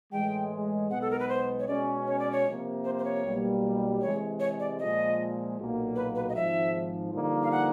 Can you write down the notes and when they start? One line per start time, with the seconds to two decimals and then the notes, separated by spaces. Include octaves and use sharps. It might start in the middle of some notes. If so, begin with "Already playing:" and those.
0.12 A2 E3 G#3 G5
0.90 B1 B2 G#3 B3 F#5
1.01 A4
1.11 A#4
1.19 B4
1.29 C5
1.60 C#5
1.68 B2 G#3 C#4 D5
2.07 C#5
2.19 D5
2.32 C#5
2.45 C3 F3 A#3
2.84 C5
2.99 C5
3.04 C#5
3.24 B1 B2 G3 A#3
4.01 C3 E3 G#3 C#5
4.40 C#5
4.59 D5
4.79 A#2 F3 G#3 D#5
5.58 B1 A#2 F#3 A#3
5.96 B4
6.15 B4
6.29 D#5
6.35 G#1 G#2 F3 E5
7.12 G2 D3 F3 A#3 D#4
7.43 F5
7.51 F#5